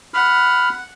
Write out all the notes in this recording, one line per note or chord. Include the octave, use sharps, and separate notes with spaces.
F#5 B5 F6